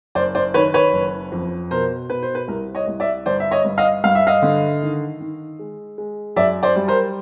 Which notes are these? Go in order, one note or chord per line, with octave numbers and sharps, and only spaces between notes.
F#1 C5 D5
C5 D5
D#3 B4 C#5
B4 C#5
F#1
F2
B2 A#4 C5
B2 B4
C5
B4
C2 A#4
C#5 D#5
C2
D5 E5
G1 C5 D5
E5
C#5 D#5
G2
D#5 F5
G2 F5
E5
D#5 F5
D3
D#3
D#3
G#3
G#3
F#2 D5 E5
C5 D5
G3
A#4 C5